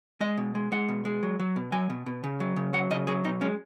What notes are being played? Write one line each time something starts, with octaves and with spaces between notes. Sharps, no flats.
G#3 D#5
B2
G#3
G#3 F#5
B2
G#3
F#3
F#3
B2
F#3 G#5
B2
B2
C#3
F#3
C#3
F#3 F#5
C#3 D#5
F#3 G#4
B2 D#4
G#3 C#4